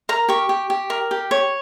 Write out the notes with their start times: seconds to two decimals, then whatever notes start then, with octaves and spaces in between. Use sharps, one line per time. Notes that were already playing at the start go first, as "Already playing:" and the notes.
0.09 A#4 A#5
0.29 G4 C#6
0.49 G4
0.70 G4
0.90 A#4
1.11 G4
1.31 C#5